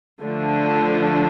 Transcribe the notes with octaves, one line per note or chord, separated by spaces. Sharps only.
D3 F3 A3 D4